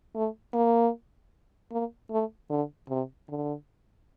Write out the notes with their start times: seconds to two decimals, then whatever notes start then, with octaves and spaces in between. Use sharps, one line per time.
0.15 A3
0.54 A#3
1.72 A#3
2.10 A3
2.50 D3
2.89 C3
3.29 D3